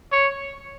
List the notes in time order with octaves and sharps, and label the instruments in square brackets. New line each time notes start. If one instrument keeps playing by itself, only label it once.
[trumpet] C#5